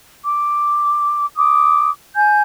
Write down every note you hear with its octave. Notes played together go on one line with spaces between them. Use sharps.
D6
D6 D#6
G#5 G6